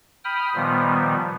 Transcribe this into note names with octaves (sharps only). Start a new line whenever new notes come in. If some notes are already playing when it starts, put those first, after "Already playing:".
G5 B5 D#6 F6
A#2 D#3 F3 G3 B3